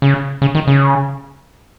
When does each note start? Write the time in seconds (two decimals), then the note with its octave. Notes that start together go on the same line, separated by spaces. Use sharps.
0.02 C#3
0.42 C#3
0.55 D#3
0.67 C#3